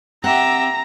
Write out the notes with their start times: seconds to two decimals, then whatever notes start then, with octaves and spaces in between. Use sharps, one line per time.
0.24 C4 G4 E5 F#5 A#5